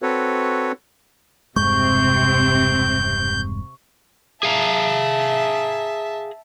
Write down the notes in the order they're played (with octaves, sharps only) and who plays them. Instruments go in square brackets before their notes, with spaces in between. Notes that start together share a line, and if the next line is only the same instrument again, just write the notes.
[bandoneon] C4 F#4 A4 B4 C#5
[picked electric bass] E1 G2 G#3 [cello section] C3 C4 [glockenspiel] C#6 [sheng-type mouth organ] G6
[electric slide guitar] G#4 F5 A#5 [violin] E5 A5